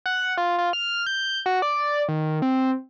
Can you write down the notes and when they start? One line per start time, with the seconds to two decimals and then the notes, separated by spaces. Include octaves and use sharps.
0.06 F#5
0.37 F4
0.58 F4
0.73 F6
1.06 G6
1.46 F#4
1.62 D5
2.09 D#3
2.42 C4